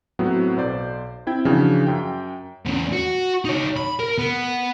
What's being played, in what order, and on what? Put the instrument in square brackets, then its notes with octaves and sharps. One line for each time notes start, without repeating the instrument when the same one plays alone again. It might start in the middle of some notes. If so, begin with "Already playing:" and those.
[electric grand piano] A2 F#3 B3 C4 F#4
B1 C5 D5
C4 E4 G5 G#6
C#3 E3 F3 D4 F#4 C#5
F#2 G5
[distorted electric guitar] E2 C#3
F#4
D#4 C#5
B5
A#4
B3